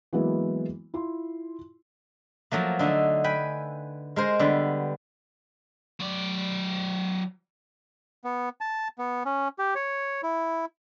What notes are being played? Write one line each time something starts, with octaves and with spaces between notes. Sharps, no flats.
E3 F#3 G#3 A#3 B3 E4
E4 F4 C6
F3 F#3 A3 A#3
D3 A3 D#4 E5
B4 G5 G#5 B5
G#3 A#4 C5 G#5
D3 G3 B3
F#3 D5
B3
A5
B3
C#4
G4
C#5
E4